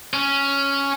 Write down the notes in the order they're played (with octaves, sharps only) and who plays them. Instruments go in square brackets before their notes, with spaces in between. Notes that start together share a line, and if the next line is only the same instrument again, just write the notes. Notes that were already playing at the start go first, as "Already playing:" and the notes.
[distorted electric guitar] C#4